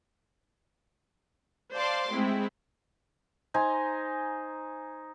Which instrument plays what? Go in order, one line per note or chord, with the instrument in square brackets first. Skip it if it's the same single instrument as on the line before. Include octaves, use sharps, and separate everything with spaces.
[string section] C5 D5 F5 A5 C6 D6
G#3 A3 C4 E4
[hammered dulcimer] D#4 C5 G#5 A#5